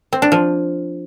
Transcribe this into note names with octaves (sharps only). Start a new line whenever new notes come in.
C4
D4
F3